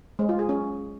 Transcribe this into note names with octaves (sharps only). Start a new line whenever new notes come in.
G#3
F4
G#4
C#4